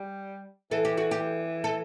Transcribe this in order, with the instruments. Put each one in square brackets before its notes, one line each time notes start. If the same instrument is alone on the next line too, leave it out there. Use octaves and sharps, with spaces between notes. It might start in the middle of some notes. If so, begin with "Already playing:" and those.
Already playing: [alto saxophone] G3
[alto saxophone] E3 [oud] A4
[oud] G4
F#4
G4
A4